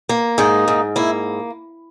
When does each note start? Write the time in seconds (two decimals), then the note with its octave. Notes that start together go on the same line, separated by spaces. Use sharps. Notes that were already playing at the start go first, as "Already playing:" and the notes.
0.09 A#3
0.38 G#2 D#4
0.68 G#2
0.96 A#3 E4